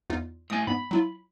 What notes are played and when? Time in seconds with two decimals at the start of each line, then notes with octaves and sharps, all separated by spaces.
0.10 E2 D#4 F4
0.50 A2 A3 G#5 D#6
0.67 G#2 B3 B5
0.91 F#3 E4 F4